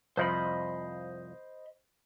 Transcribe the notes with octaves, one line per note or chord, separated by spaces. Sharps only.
C2 F2 F3 C5 D#5 B5